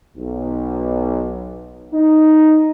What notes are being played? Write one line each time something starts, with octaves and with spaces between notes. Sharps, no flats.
B1
D#4